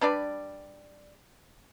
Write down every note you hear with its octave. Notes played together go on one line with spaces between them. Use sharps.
G3 D4 B4 D5